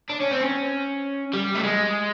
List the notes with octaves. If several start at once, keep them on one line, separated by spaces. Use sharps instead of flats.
D4
C#4
C4
C#4
G3
A3
G#3